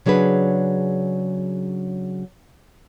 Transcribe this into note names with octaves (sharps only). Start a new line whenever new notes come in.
C#3 F#3 D4 G#4 B4